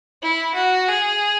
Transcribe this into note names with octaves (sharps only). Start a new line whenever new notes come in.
E4
F#4
G#4